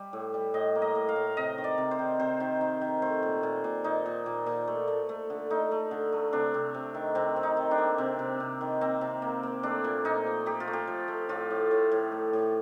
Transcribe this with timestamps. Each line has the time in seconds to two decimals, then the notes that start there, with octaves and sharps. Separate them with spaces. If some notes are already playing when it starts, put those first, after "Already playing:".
Already playing: G3
0.13 A2
0.34 G3
0.54 A2 D#5
0.75 A#3
0.82 D#5
0.95 A2
1.09 F5
1.16 A2
1.37 C3 D#5
1.58 D#3
1.64 D5
1.78 C3
1.91 C5
1.99 D#3
2.19 C3 C5
2.40 D#3
2.61 D#3
2.81 D#3
3.02 A3 C5
3.23 A#2
3.43 A#2
3.64 A#2
3.84 A#2 D#4
4.06 A#2
4.26 A#2
4.46 A#2
4.68 A3
4.88 A3
5.09 A3
5.30 D3
5.50 A3 D#4
5.72 A3
5.91 D3
6.12 A3
6.33 C3 D4
6.54 C3
6.74 C3
6.94 D#3
7.15 C3 C4
7.36 C3
7.43 D#4
7.57 D#3
7.71 D4
7.78 A#3
7.98 C3 C4
8.19 C3
8.40 C3
8.61 D#3
8.81 A#3 C4
9.01 C3
9.22 A#3
9.43 A#3
9.63 A3 D4
9.84 A#2
10.05 A#2 D#4
10.26 F3
10.46 A3 G4
10.60 F4
10.68 A3
10.73 G4
10.87 F3
11.08 A3
11.29 A2 F4
11.50 A2
11.71 A2
11.92 A2
12.12 A3
12.33 A2